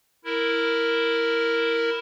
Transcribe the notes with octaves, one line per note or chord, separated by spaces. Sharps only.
E4 A#4